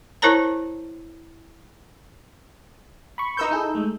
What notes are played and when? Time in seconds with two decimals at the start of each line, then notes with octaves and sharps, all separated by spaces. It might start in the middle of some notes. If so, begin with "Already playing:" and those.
0.22 E4 A#4 C5 C#5 A5 A#5
3.18 B5 C#6
3.37 D#4 A#4 B4 C#6 E6 G6
3.51 E4 G#4 A4
3.75 G#3 A3